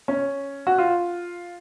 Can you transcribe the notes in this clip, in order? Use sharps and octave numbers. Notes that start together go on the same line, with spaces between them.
C#4
F#4
F4